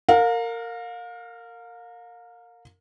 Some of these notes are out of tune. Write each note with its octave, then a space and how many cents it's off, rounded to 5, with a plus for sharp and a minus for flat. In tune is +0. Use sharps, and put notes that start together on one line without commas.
A#4 -20 F5 +30